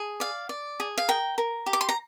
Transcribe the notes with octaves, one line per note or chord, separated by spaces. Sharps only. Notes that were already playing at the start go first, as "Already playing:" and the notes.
Already playing: G#4
D5 F5
D5
G#4
F5
A#4 G5
A#4
G4
D6
C6
A#5